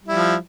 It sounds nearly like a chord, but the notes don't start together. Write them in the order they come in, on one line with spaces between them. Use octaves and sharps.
G3 E4 F3